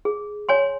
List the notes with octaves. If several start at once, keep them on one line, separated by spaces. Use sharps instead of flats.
G#4
C#5 G#5 C6